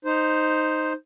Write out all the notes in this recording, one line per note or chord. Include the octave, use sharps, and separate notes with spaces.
D#4 C5